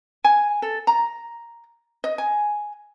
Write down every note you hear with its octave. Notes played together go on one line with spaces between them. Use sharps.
G#5
A4
A#5
D#5
G#5